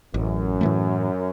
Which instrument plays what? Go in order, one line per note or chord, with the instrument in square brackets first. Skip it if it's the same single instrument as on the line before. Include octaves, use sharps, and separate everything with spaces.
[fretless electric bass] A1 [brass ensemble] F#2
[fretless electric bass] A2 E3 A3